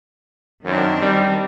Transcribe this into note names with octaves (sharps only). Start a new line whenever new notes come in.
F#2 D#3 C4 D4
G3